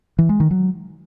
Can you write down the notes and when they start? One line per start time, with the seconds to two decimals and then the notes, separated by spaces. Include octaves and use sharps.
0.19 E3
0.29 G#3
0.40 D#3
0.51 F#3